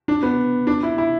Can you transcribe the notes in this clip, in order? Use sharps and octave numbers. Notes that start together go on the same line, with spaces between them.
D4
B3
D4
E4
E4